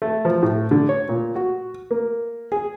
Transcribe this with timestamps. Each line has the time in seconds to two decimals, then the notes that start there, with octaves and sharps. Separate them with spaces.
0.02 A3
0.25 F3
0.42 A2
0.71 D3
0.89 C#5
1.09 A#2
1.36 F#4
1.91 A#3
2.52 G#4